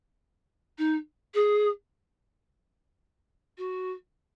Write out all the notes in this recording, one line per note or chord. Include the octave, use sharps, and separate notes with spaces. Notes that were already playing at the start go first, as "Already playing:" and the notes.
D#4
G#4
F#4